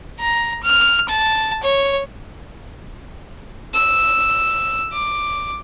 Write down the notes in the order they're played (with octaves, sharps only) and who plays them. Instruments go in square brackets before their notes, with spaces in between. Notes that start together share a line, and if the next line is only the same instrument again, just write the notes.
[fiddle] A#5
F6
A5
C#5
[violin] E6
D6